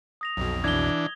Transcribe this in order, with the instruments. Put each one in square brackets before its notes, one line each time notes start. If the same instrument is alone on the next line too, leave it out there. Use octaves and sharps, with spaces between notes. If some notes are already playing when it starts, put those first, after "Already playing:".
[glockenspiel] D#6 A#6 F7
[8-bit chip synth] B1 F2 B2
[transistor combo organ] E3 D4 [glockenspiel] G#6 G7